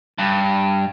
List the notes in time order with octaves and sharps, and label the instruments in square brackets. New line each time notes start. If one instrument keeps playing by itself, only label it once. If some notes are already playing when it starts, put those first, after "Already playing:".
[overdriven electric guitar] G2